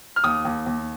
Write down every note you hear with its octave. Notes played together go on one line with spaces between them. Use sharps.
F6
D#2 D#6
D#2
D#2